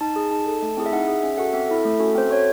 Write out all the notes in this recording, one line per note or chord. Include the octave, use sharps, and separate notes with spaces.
D#4 A5
G#4
D#4 A5
A4
A3
C4 E4 G#4
E5
D#4 F#5
G#4
C#4 E5
F#4 A4 F#5
C4 E5
E4 A4
A3
C#4 F#4 A4
C4 C5
F#4 A4 C#5